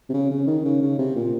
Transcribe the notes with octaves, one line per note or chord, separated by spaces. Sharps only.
C3
C#3
C#3
D#3
C#3
C#3
C3
A#2